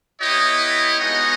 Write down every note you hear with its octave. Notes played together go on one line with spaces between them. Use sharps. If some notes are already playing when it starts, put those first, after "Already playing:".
B3 E4 G4 C#5 D#5
G#3 B3 D#4 F#4